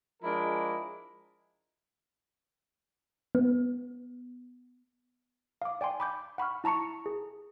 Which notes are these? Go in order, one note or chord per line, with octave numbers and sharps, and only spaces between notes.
F3 G#3 D4 E4 A#4 D#5
B3
F5 D6
D5 G5 G#5 C6
B5 D6 G6
F#5 B5 C#6 F6
E4 A5 A#5 C#6 C#7
G#4